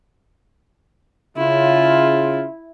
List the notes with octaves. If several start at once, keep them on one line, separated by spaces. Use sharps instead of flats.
C#3 E4 F4